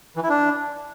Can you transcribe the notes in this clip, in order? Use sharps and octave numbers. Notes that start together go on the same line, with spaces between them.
E3
E4
D4